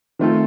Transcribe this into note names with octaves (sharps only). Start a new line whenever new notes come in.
D#3 A3 C4 F4 A4